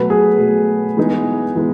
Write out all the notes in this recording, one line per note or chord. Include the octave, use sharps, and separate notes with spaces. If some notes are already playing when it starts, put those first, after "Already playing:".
Already playing: B2 F#3 A3 B4
G#4
B2 F#3 A3
E3 G#3 B3 D#4 G#4
E3 G#3 B3